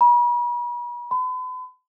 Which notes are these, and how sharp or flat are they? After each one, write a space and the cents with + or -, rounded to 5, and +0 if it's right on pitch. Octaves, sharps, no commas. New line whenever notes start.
B5 -40
B5 +40